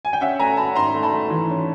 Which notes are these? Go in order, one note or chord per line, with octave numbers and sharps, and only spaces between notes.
G#5
G5
C#4 E5 F#5
A3 G#5 A#5
C#4 A5 B5
G#2 A#5 C6
A3
A5 B5
A3
E3
C#4